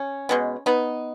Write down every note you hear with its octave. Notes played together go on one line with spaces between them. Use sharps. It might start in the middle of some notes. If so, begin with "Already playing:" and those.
Already playing: C#4
B2 G#3 B3
B3 D#4